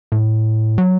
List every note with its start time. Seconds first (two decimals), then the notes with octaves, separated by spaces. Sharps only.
0.12 A2
0.78 F#3